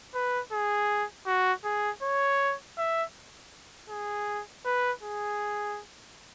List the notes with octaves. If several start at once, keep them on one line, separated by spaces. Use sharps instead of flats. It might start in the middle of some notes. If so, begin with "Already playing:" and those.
B4
G#4
F#4
G#4
C#5
E5
G#4
B4
G#4